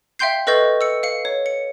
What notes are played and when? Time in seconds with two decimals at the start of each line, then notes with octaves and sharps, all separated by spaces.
0.19 E5 F5 G5 C6 G6 C7
0.47 A4 B4 D#5 C#6 G6 A6
0.81 E6 C#7
1.03 F5 C#7
1.25 C#5
1.46 C#7